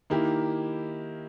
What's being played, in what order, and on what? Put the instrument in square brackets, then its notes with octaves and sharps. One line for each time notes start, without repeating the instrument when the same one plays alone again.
[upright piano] D#3 A#3 E4 G4